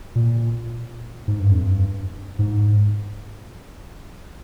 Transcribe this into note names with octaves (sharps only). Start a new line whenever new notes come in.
A#2
G#2
G2
F2
G2
G#2